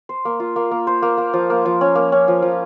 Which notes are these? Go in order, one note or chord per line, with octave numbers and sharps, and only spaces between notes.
C5
A#3
F4
A#3
A#3
C5
A#3
A#3
F3
A#3
F3
C#4
A#3
C#4
F3
F3